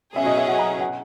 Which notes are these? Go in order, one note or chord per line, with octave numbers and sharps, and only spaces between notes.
B2 F#3 C#4 G#4 E5
D#5
E5
F#5
A#5
F#5